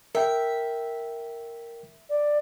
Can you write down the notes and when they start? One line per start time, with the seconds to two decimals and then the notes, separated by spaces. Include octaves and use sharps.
0.15 A#4 E5 G5
2.10 D5